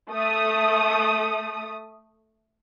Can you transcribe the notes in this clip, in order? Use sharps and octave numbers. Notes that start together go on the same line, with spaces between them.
A3 D#6